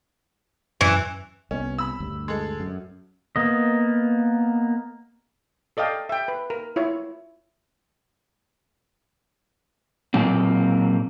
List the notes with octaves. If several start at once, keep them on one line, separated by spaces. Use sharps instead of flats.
F#2 E3
C2 B3 C#4
B5 E6
D2 G2
G#3 A4
F#2
A#3 B3 D#5
A4 D5 D#5 F5 G5
E5 G5
B4
A#4
E4 F4 C#5
A#2 F#3 A#3 C4